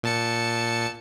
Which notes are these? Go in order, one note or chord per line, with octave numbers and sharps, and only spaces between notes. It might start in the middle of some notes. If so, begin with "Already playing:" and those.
A#2 A5 C#7